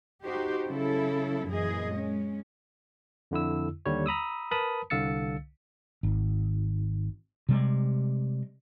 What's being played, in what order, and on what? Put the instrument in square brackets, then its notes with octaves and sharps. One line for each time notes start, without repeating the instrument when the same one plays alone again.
[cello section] D#4 F#4 G4 C5
C#3 F#3 E4 A4
F#2 A#2 E3 G#4 D#5
G#3 C#4
[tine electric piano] F2 D3 E4 E6
D#2 D3 G3 C#5
A#5 B5 D#6 E6
A#4 B4 A5 B5 D#6
C2 D3 F5 E6 A6 C#7
[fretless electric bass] G#1
C3 G3 G#3